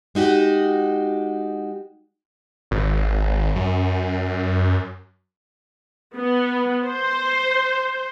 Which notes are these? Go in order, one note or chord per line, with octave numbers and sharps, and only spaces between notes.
G#3 D#4 F#4 G4
G#1
F#2
B3
C5